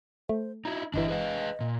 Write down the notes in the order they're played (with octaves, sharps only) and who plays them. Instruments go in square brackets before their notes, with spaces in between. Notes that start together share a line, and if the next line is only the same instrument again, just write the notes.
[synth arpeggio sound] A3 [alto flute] C5
[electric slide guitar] D#4 E4 [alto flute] F#4 [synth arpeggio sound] A#5
[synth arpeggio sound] G1 E3 [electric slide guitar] D4 G4 E5 [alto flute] D#5
[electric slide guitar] G#4 B4 F5
A#2